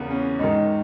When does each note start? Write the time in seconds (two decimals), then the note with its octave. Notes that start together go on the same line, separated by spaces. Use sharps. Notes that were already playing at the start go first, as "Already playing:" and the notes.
Already playing: E2 C#3 E3 B3 A#4
0.10 C#4
0.39 G#2 D#3 D#4